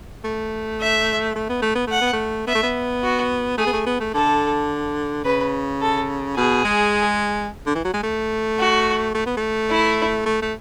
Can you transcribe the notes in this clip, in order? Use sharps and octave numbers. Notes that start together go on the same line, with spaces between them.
A3
E5
A3
B3
A3
B3
A3 F#5
B3
A3
B3 E5
A3
B3
F#4
A3 G#4
B3
A3
B3
A3
D3 A4
C#3 B4
A4
B2 G#4
G#3
D3
E3
F#3
G#3
A3
F#4
A3
B3
A3
E4
A3
A3